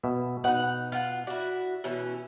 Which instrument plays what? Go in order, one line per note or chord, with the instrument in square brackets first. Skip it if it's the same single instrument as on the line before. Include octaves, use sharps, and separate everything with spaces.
[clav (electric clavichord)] B2 E5
[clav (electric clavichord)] B2 [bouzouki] D#4 F#5
[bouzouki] F4 F#5
[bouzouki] E4 F#4 [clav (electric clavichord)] D5
[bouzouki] B2 E3 C#4